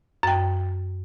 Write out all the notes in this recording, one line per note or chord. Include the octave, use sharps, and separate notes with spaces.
F#2 G5